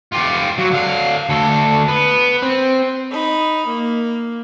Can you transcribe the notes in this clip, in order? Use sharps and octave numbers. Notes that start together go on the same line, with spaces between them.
F4 G4
F#3
D3 F5
D2 A4
B3
C4
D#4 B5
A#3